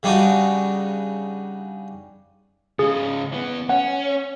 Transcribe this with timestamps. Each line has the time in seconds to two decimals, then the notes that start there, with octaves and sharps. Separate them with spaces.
0.03 C#3 G3 D4 D#4 F#4
2.79 G#2 C#3 G#4
3.32 E3 B3
3.69 C#4 F#5